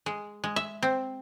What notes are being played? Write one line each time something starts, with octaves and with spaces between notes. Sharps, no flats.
G#3
G#3
E5
C4